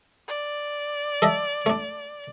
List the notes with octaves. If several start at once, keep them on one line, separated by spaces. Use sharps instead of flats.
D5
A4 D#5 E5
A3 D4